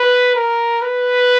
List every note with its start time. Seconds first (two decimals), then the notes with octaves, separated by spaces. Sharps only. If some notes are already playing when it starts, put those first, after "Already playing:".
Already playing: B4
0.35 A#4
0.82 B4